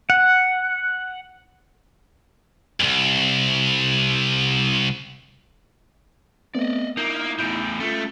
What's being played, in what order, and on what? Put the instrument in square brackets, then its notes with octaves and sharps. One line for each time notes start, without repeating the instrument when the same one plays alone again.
[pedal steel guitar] F#5
[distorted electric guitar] C2 F2
[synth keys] A3 B3 C4 [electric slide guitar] D5 D#5
[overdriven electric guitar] A#3 [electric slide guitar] D#4 E4 [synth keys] G6
[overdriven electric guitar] E2 A2 [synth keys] G6 D7
[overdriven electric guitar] A3 [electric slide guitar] C#4 F4